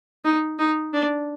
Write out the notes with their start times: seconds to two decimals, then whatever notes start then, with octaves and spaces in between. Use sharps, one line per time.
0.25 D#4
0.59 D#4
0.93 D4